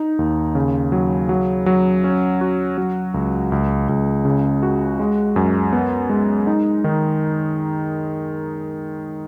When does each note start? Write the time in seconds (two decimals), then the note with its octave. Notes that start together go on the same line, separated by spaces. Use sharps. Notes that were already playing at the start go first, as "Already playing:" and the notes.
Already playing: D#4
0.19 D#2
0.55 C#3
0.92 F#3
1.29 F#3
1.66 F#3
2.04 C#4
2.41 F#4
2.78 F#3
3.14 C#2
3.52 C#2
3.89 C#2
4.25 C#3
4.63 F#4
4.99 G#3
5.36 F#2
5.73 B3
6.10 G#3
6.47 D#4
6.84 D#3